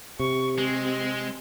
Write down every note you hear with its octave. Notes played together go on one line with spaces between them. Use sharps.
C3 G4 C#6
G#3 C4